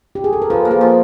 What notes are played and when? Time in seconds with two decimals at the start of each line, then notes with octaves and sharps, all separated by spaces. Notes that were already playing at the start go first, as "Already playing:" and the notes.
0.15 G4
0.24 G#4
0.33 A4
0.42 A#4
0.50 F3 A4 B4
0.65 A#3
0.71 G#4 A#4
0.81 F3